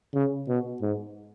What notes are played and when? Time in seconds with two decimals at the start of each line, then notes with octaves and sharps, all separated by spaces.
0.14 C#3
0.48 B2
0.82 G#2